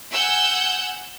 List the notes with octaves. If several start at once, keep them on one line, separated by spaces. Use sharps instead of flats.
F#5 G#5 E6 G6